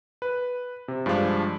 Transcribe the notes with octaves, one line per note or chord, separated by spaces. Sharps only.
B4
C3
G2 F3 G#3 D4 F5